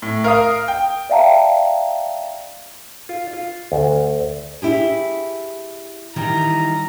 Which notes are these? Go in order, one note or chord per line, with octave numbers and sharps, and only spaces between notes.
A2
A#4 F5 D#6
G5
D5 E5 F5 G5 A5 A#5
F4
F4
D2
E4 G4 G#4
D#3 E3 G3 A#5